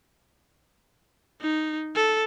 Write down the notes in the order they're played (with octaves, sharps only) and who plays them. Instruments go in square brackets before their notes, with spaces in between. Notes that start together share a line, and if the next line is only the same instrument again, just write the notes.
[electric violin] D#4
A4